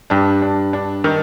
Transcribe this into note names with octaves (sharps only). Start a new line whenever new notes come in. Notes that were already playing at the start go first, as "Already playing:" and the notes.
G2 D4
D4
D4
D#3